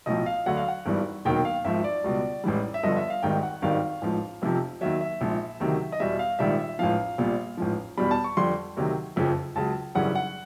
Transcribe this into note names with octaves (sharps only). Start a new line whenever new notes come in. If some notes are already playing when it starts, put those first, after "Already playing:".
B1 A2 F3 D#5
F5
D2 D3 F#3 F#5
F5
F#5
G#1 G2 E3 G3
E1 D#2 D#3 F#3 G5
F5
G#1 G#2 F3 E5
D5
C#2 B2 G3
A1 G#2 E3 G3
E5
G1 G2 D3 F3 D#5
E5
F5
G#1 G#2 D#3 G3 G5
F#5
G#1 G2 D#3 G3 F5
A1 G#2 F3
F1 F2 C3 F3
D#2 D#3 F#3 E5
E5
A#1 G#2 F3
D2 C3 D#3 F#3
D#5
E2 B2 G3 E5
F5
A#1 G#2 D#3 G3 E5
E5
A1 G#2 F3 F5
A#1 A#2 G3
A1 G#2 F3
E2 B2 G3 B5
A5
C#6
F2 D3 G3 C6
D2 C3 D#3 F#3
F#1 F2 C#3 F3
C#2 C#3 F#3 A5
G#1 F#2 C#3 E3 G3 F#5
F#5